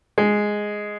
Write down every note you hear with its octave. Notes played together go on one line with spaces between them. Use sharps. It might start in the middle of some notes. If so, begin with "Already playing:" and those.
G#3